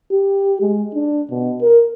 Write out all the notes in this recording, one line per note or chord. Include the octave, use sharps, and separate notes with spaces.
G4
G#3
D4
B2
A#4